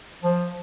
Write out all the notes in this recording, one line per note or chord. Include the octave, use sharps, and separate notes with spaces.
F3